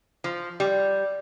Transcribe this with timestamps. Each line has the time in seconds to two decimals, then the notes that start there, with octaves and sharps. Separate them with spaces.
0.24 F3
0.60 G3